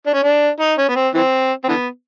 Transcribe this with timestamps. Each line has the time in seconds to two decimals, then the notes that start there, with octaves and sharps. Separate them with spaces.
0.06 D4
0.14 C#4
0.23 D4
0.60 D#4
0.78 C#4
0.88 B3
0.96 C4
1.14 E3 C4
1.64 C4
1.68 D3 E3 B3